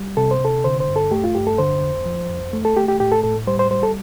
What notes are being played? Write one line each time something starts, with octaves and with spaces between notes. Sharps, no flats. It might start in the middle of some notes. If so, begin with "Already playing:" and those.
Already playing: G3
C3 A4
C5
C3 A4
D3 C5
C5
G2
A4
A3 G4
F4
G2 G4
A4
D3 C5
F2
F3
F2
A3
A4
A3 G4
G4
A2 G4
A4
A2 A4
G3 C5
C5
G3 C5
A4